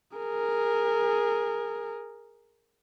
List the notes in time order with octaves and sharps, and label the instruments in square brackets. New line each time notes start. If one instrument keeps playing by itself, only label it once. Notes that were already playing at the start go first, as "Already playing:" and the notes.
[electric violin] G#4 A#4